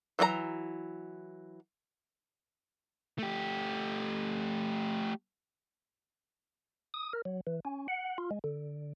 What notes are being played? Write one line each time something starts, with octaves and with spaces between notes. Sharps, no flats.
E3 F#3 F#4 A#5
A3 G4
D#6
A#4
F#3
E3
C#4
F#5
F4
G#3
D3